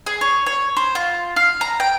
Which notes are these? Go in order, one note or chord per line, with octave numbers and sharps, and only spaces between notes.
G#4
C#5
C#5
C5
F4
F5
A#5
G5